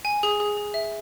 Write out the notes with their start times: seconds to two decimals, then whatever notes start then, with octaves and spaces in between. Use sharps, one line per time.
0.05 G#5
0.23 G#4
0.40 G#4
0.57 G#4
0.74 E5